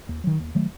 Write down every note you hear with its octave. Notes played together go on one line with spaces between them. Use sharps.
D#2
D#3 F#3
D#2
D#3 F#3 A3